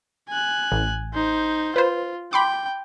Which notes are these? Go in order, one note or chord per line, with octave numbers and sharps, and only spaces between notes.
G#5 F#6
A1
D#4 C5
F4 B4 C5
G5 B5 C6 D6